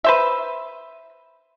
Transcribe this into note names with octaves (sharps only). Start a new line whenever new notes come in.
B4 C5 E5